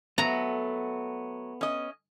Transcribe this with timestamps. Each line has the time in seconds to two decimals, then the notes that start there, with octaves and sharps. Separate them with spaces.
0.18 F#3 A3 B3 A#5
1.61 C#4 D#5